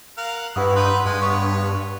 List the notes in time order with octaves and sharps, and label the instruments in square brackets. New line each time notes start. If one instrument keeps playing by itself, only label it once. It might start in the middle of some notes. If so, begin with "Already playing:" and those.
[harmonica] A#4 F5 F#5
[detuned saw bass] G2 [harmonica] E4 F#4 [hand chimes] B4 F#5 D#6
[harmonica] D#4 B4 D#5 [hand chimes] C6
[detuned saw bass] G2 [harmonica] G#3
[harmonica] B3 C#5 C#6